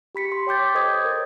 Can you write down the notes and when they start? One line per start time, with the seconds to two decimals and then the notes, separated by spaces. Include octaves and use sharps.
0.15 G4 B5 B6 C#7
0.32 C6
0.47 C#5 G5 D6 G6 A6
0.75 A4 C5 D#5 D#6 G#6
1.05 A#4 C#5